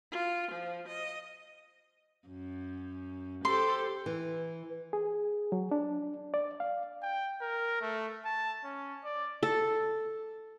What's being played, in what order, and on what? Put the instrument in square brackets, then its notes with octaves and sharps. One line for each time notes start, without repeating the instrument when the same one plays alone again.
[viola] F4
F3
D#5
[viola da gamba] F#2
[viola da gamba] G4 A4 C5 [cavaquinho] C6
[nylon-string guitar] E3
[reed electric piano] G#4
F#3
D4
D5
F5
[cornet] G5
A#4
A3
A5
C#4
D5
[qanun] A4